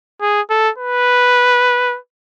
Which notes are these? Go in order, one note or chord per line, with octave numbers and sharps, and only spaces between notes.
G#4
A4
B4